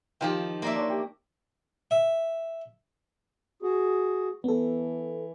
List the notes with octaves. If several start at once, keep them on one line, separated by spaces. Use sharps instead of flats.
D#3 F3 F4 G4 G5
A#3 D5 E5 C6 E6
D4 C#5
G4
E5
F#4 G#4
E3 B3 A4